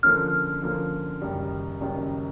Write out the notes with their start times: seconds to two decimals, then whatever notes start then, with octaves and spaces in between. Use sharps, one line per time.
0.03 D3 F3 A#3 C#4 F6
0.62 D3 F3 A#3 C#4
1.21 F#1 F#2 D#3 G3
1.81 F#1 F#2 D#3 G3